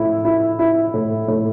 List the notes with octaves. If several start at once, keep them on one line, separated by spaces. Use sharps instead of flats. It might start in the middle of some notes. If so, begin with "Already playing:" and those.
Already playing: A2 E4
E4
E4
A2
A2